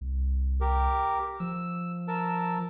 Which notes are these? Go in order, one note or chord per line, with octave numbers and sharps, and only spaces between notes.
C2
G4 A#4
F3 E6
A#4 A5 E6